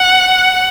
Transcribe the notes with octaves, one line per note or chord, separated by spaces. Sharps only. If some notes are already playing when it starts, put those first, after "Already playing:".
Already playing: F#5